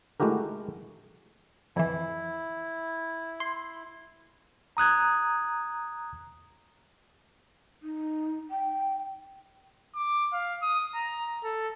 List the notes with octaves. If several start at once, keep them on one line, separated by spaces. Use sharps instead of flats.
G#3 A3 E4 F#4 G4 A#4
F2 E3 E4
C6
A#5 D#6 F#6 G#6
D#4
G5
D6
F5
D#6
A#5
A4